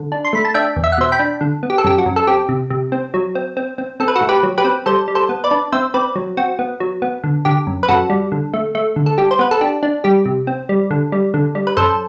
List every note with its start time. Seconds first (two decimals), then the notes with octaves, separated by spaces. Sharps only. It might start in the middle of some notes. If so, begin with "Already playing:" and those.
Already playing: D3
0.12 D4
0.25 C6
0.33 A3 B5
0.45 A5
0.54 D4 E5 G5
0.76 E2
0.84 E5
0.92 F#5
0.98 B2 C5 E5
1.12 G5 B5
1.19 D4
1.41 D3
1.63 B3
1.70 G4
1.78 A4
1.84 F#2 G4
1.98 F#4
2.06 F#2
2.16 A4
2.27 C4 G4
2.49 C3
2.70 C3
2.92 C4
3.14 F#3
3.35 C4
3.57 C4
3.78 C4
4.00 C4 A4
4.08 B4
4.15 F#4 A4
4.21 A2
4.29 G4 B4
4.43 F#3
4.58 G4 B4
4.65 C4
4.86 G3 A4 C5
5.08 G3
5.15 A4 C5
5.29 B3
5.44 B4 D5
5.51 D4
5.72 C4 C5 E5
5.94 C4 B4 D5
6.16 F#3
6.37 C4 F#4
6.59 B3
6.80 F#3
7.02 B3
7.24 D3
7.45 D3 G4
7.67 F#2
7.83 B4
7.88 F#2 F#4 A4
8.10 G3
8.32 D3
8.54 A3
8.75 A3
8.96 D3
9.06 A4
9.18 G3 G4
9.31 C5
9.39 B3 B4
9.51 A4
9.61 D4 G4
9.83 D4
10.04 G3 G4
10.25 C3
10.47 C4
10.69 G3
10.91 D3
11.12 G3
11.34 D3
11.55 G3
11.67 B4
11.77 F#2 A4 C5